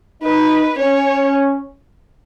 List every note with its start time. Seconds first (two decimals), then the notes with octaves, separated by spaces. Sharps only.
0.22 D#4 B4
0.78 C#4 C#5